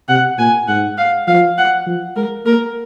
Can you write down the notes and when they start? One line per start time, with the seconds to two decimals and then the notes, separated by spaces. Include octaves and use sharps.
0.09 C3 F#5
0.38 A#2 G#5
0.68 G#2 F#5
0.98 F5
1.28 F3 F5
1.58 F#5
1.86 F3
2.16 G#3 A#4
2.46 A#3 A#4